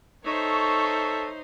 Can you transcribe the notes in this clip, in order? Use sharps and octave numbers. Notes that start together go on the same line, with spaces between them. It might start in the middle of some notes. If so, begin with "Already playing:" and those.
D#4 A4 C5 C#5 E5 C#6